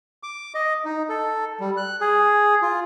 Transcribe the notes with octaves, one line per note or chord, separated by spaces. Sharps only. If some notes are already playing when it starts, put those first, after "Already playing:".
D6
D#5
D#4
A4
G3
F#6
G#4
F4